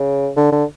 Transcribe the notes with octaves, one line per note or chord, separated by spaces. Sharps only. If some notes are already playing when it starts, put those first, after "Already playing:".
Already playing: C#3
D3
D3